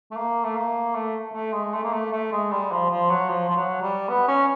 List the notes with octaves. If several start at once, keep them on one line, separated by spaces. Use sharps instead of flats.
A3
A#3
A3
A#3
A3
A3
G#3
A3
A#3
A3
A3
G#3
G3
F3
F3
F#3
F3
F3
F#3
G3
B3
C#4